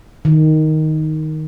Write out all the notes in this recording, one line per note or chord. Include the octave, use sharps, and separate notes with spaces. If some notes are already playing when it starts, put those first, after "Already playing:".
D#3